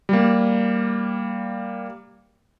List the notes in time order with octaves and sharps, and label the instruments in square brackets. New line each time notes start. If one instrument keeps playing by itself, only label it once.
[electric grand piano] G3 A#3